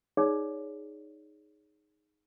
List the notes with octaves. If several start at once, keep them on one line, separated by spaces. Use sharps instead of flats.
D#4 G#4 C#5 D5